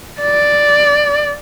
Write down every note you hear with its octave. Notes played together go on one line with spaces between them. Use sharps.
D5